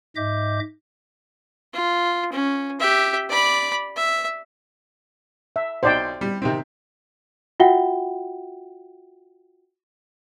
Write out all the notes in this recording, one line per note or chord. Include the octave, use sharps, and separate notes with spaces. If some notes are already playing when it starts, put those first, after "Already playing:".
G#2 D#5 E5 D6 G6
F4
C#4
G4 E5
D5 B5
E5
E5
B1 D#4 C5 D5 G5
G3
C3 D#3 C4
F4 F#4 E5 F#5 G5 G7